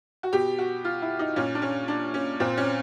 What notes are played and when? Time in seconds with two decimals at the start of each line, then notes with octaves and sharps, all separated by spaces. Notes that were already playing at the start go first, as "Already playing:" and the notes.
0.23 F#4
0.33 B2 G4
0.59 F#4
0.85 F4
1.02 E4
1.19 D#4
1.36 A#2 C#4
1.55 D4
1.62 C#4
1.88 D4
2.14 C#4
2.40 A#2 C4
2.57 C#4